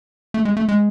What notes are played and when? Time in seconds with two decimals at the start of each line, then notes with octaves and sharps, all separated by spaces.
0.34 A3
0.45 G#3
0.57 A3
0.69 G#3